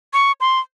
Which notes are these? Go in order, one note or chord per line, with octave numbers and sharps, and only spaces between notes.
C#6
C6